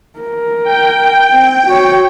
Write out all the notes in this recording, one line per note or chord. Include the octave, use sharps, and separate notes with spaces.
A#4
G5
C4
F#4 C#5